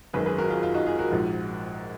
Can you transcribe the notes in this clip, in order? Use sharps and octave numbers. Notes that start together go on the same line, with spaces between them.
G#1 F#2 D#3 G#4 B4
G#4 B4
F#4 A#4
F4 G#4
F4
D#4 F#4
F4 G#4
F#4 A#4
A#1 G#2 F3